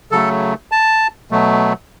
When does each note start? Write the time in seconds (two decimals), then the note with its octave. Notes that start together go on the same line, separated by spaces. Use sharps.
0.12 C#3 F#3 A3 A4
0.72 A5
1.31 B2 F#3 A3